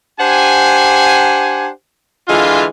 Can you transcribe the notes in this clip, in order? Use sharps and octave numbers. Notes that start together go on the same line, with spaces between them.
D4 G4 C5 F#5 G#5
D3 E3 G#3 F4